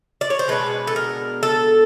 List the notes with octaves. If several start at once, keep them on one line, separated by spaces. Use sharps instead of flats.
D5
C#5
C5
B2 G#3 B3 D4 B4
A4
A#4
A4